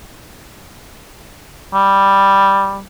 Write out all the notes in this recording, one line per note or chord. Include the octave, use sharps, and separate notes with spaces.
G3